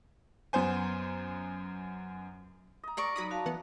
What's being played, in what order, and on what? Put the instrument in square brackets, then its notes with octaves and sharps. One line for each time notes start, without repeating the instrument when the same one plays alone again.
[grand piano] F#2 B3 C5 G#5
[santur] D#5 A#5
[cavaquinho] A#4 D5 C#6
[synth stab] F#3 B5 D#6 [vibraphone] D#4
[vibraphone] F#4 F5 A5
[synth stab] E3 B3 F#5